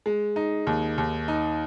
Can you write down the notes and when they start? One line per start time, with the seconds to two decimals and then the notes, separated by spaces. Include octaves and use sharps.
0.06 G#3
0.36 D#4
0.67 D#2
0.98 D#2
1.28 D#4